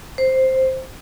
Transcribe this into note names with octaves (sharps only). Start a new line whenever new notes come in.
C5